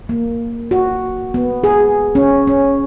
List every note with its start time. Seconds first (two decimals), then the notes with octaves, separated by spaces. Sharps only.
0.09 A#3
0.71 F#4
1.34 B3
1.64 G#4
2.15 C#4
2.47 C#4